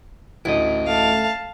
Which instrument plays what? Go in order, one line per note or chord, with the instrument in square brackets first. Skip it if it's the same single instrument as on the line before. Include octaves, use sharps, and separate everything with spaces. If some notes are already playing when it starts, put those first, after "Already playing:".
[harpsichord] A1 D2 [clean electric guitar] E4 D#5
[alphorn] A3 [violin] F5 A5